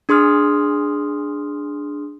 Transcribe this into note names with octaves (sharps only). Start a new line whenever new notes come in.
D4 G#4 C6 D#6 F6